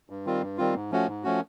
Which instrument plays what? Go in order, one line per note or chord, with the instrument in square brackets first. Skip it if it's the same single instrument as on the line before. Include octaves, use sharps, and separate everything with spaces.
[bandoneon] G2
D#3 G3 C4 F4
G2
D#3 G3 C4 F4
G#2
F3 A3 C#4 F#4
G#2
F3 A3 C#4 F#4